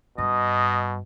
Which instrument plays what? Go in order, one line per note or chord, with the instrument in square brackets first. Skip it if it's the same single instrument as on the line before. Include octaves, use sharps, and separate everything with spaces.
[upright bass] G2 [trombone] B2 [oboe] D#5